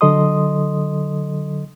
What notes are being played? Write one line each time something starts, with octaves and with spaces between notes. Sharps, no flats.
D3 F#3 A4 D#5 C6 D#6